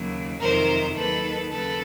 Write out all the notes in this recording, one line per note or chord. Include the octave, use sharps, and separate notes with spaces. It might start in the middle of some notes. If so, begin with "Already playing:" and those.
Already playing: D#2 C#3 F#3
F2 C3 D#3 F#3 A#4 C5
D#2 D#3 F#3 A4 B4
D#2 C#3 F#3 A4 B4